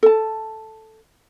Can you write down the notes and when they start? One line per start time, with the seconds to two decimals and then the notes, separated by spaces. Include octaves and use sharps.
0.03 A4 A5